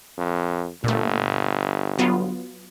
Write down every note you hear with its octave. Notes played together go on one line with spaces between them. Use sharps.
F2
G1 A#2 A3
F#3 B3 F4